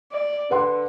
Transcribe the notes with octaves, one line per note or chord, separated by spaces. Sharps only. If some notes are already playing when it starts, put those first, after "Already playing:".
D5
D3 B4 F#5 C6